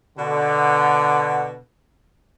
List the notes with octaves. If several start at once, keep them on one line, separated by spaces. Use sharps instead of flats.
B2 D3